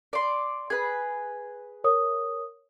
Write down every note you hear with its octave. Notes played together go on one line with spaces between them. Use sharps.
D5 C6
G#4 B4 G#6
A#4 C#5 D#6